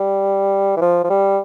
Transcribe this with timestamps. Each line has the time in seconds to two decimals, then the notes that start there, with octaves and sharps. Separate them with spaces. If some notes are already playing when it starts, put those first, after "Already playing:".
Already playing: G3
0.77 E3
0.82 F3
1.04 F3
1.10 G3